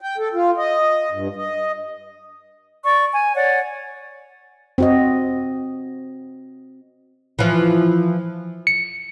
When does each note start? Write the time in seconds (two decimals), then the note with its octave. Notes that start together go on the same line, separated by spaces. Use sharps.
0.01 G5
0.18 A4
0.34 F4
0.57 D#5
1.12 G2
1.36 D#5
2.85 D5 C#6
3.13 G#5
3.34 C#5 D5 F#5
4.78 C4 F#4 D#5
7.39 E3 F3
8.67 C#7